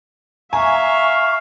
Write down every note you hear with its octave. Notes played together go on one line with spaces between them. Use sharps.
E5 F5 G#5 A#5 C#6